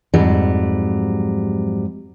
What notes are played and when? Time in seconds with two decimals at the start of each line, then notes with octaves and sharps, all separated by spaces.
0.14 F2 G#2 F#3 G3